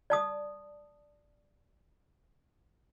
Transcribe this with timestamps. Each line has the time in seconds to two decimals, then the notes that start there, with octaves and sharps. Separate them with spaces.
0.10 D5 A5 D#6